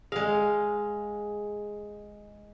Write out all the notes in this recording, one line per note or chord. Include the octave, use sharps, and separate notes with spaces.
G#3 G#4 F5